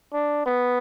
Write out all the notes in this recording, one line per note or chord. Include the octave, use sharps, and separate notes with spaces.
D4
B3